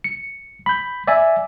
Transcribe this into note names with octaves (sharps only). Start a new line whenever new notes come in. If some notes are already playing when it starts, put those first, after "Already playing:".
C#7
B5 G6
D5 E5 G#5